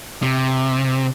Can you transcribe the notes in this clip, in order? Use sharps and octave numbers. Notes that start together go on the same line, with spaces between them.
C3